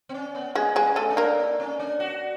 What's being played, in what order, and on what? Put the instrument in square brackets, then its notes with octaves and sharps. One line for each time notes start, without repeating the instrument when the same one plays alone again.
[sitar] C4
C#4
B3
[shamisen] G#3 G#4 [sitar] B3
[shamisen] G#3 G#4
[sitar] C#4
[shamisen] A3 A4
[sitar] D4
[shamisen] A#3 A#4
[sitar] D#4
C#4
D4
F#4